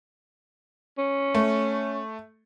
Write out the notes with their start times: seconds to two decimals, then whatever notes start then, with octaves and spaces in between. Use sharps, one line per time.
0.98 C#4
1.35 A3